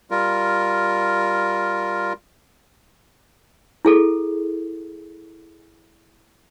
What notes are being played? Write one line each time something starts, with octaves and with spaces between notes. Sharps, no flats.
G3 F4 A#4
E4 G#4 A4